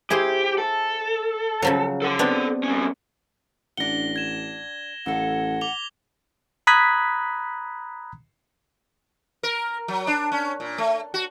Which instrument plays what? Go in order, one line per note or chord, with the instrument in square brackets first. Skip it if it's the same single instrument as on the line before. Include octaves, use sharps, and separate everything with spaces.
[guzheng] E4 G#4 C5 [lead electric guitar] G4
[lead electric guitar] A4
[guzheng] C#3 F3 F#3
[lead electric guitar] A4 F#5
[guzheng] B3 C4 D4
[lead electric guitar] G2 C#4
[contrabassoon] A1 [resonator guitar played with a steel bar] D4 F#5 [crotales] A#6 G7
[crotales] G#6 E7
[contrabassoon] A1 [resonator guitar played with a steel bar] F#2 A4 F5 [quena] F#5
[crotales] D6 F7 G7
[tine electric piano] A#5 B5 D#6 F#6 G#6 B6
[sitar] A#4
F#3
D4
C#4
A#2
A3
F#4